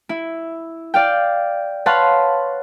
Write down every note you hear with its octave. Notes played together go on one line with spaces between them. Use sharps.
E4
D5 F5 G5
B4 C#5 F5 F#5 A5 C6